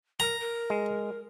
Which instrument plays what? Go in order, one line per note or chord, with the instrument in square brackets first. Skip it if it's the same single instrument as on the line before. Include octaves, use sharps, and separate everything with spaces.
[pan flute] A#4 [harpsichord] A#5
[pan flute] A#4
[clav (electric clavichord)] G#3